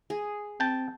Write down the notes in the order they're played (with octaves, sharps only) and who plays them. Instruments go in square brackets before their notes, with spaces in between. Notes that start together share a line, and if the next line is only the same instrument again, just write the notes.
[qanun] G#4
[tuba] C4 [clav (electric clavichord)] G5 A5